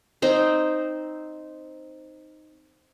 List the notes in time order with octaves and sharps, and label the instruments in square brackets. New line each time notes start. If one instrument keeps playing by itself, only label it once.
[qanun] C4 D#4